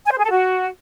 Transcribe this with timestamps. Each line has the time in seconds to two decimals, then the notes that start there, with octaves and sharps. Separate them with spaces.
0.06 G#5
0.12 C5
0.18 G#4
0.24 A4
0.31 F#4